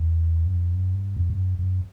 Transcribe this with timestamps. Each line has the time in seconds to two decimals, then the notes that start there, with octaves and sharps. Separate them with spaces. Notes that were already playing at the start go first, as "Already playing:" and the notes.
Already playing: E2
0.46 F#2
0.53 F2
0.75 F#2
0.95 G2
1.17 F2
1.30 G2
1.37 F#2
1.59 F#2